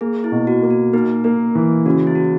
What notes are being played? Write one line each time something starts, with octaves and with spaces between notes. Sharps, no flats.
A#3 G#4
E4
B2
F#4
A#3
F#4
A#3 D#4
A#3 A#4
E3
C#3 F#4
E4
F#4